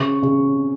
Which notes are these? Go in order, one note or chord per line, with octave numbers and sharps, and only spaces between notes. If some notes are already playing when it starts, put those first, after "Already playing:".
Already playing: C#3 C#6
C#3